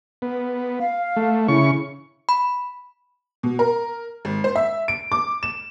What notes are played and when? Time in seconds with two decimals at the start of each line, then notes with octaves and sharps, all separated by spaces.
0.22 B3
0.80 F5
1.16 A3
1.48 C#3 E4 C#6
2.29 B5
3.43 B2
3.59 A#4
4.25 G#1
4.44 C5
4.56 E5
4.88 D7
5.12 D6
5.43 E7